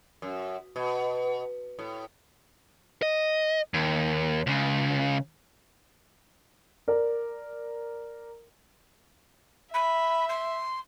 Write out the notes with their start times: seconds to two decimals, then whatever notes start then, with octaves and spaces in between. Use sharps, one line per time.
0.22 F#2
0.76 B2
1.79 A2
3.02 D#5
3.74 D#2
4.47 C#2 C#3
6.88 A#4 D5
9.73 E5 B5
10.28 C6